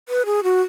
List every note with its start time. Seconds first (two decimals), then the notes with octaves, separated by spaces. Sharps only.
0.09 B4
0.26 G#4
0.43 F#4